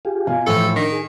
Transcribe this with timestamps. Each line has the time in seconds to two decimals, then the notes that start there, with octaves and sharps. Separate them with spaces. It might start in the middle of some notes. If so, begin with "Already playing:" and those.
0.05 F4 G4 G#4
0.27 B2 F4 F5 G#5
0.46 A2 E3 F3 A4
0.76 D#3 D4 A#6
0.92 G#4